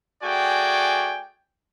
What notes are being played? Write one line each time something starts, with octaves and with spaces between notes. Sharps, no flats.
A3 F#4 G#4 D5 G5 G#5